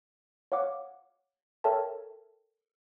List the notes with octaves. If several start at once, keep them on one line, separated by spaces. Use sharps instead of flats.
C#5 F5 F#5 D6
A4 A#4 C#5 E5 G5 A5